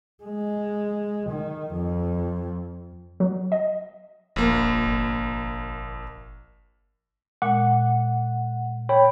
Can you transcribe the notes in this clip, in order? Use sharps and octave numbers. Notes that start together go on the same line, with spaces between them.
G#3
D#3
F2
F#3
D#5
E1 A#1 A#3
G1
A#2 G#3 F#5
C#5 G5 B5